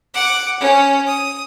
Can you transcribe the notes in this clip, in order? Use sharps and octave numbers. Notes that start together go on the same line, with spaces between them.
F#5 D6
C#4
D#6